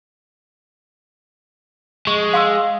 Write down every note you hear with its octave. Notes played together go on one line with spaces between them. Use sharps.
G#3 C#6
F5 C6 E6